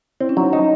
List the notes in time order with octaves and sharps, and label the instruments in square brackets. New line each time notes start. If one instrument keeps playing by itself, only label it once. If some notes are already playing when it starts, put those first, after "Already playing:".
[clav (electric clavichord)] C4 [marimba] E4
[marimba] C#4
[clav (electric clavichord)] F#3 [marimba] D#4
[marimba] C#4 [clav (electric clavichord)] D#4